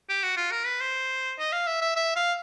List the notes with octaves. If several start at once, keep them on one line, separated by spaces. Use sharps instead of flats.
G4
F#4
F4
A#4
B4
C5
D#5
F5
E5
E5
E5
F5